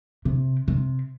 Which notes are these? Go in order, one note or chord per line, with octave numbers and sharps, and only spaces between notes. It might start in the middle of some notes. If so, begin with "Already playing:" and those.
C3
C3